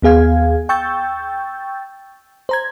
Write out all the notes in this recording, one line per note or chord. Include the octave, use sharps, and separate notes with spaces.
D#2 B3 G#4 F5 G#6
G5 C#6 E6 G6 A6
C5 A#5 G#6